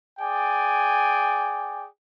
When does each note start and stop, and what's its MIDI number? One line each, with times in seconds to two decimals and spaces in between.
0.19 1.86 68
0.19 1.86 74
0.19 1.86 79
0.19 1.86 80